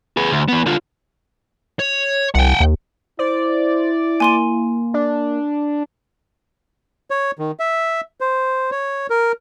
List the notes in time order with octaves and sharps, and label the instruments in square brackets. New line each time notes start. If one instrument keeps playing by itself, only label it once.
[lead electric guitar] G#4 B4
D2
E3 B3
D3 F4
[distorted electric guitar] C#5
[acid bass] C2 [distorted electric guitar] F#5 G5
[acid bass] D#2
[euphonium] E4 [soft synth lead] C5 [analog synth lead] D5
[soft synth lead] A#3 [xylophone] G#5 C6 D#7
[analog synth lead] D4
[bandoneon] C#5
D#3
E5
C5
C#5
A#4